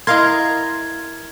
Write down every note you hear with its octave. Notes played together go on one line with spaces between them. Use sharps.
E4 A#4 D#5 F5 C6 G#6